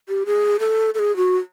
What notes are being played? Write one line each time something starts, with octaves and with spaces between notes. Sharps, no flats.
G4
G#4
A4
A4
G#4
F#4